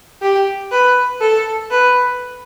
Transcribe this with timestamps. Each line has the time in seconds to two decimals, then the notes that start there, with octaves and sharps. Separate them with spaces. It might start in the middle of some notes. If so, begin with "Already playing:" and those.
0.22 G4
0.71 B4
1.21 A4
1.71 B4